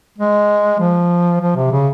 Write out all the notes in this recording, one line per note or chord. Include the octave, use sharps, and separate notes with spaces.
G#3
F3
F3
C3
C#3